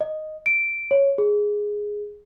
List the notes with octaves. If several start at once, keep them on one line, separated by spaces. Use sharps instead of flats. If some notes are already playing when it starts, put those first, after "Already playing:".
D#5
D7
C#5
G#4